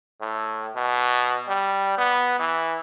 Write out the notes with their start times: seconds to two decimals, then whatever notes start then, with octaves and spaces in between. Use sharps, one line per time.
0.21 A2
0.76 B2
1.48 G3
1.98 B3
2.39 E3